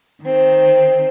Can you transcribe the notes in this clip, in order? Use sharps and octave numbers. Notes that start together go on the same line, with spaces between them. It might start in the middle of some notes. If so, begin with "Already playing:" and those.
D#3 C4